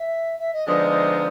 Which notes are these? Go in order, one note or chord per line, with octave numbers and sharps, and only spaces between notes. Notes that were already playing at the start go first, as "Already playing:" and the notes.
Already playing: E5
E5
D#5
D3 F3 G#3 B3 D#4 D5